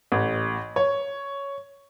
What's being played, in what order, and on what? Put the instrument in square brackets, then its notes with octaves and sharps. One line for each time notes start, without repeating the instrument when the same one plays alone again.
[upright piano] A1
C#5